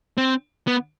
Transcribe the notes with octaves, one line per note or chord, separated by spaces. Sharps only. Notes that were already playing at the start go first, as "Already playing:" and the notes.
C4
B3